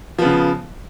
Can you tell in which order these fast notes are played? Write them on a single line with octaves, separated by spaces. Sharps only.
F3 B3 C#3